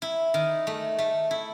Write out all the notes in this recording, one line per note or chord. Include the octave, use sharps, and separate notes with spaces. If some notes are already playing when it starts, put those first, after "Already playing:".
E4
D#3
A3
A3
E4